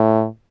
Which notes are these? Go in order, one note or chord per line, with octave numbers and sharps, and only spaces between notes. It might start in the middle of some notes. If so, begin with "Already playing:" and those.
Already playing: A2